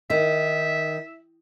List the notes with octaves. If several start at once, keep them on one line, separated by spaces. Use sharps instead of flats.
D#3 E5